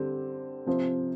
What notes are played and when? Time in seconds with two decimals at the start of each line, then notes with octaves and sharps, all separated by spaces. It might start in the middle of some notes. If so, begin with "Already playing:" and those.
Already playing: D3 G3 C4 G4
0.66 C3 F3 C4